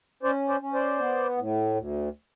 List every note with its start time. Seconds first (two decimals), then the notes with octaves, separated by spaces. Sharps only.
0.23 C#4 C5 D5
0.48 C5 D5
0.61 C#4
0.74 C5 D5
0.99 B3
1.37 A2
1.75 D2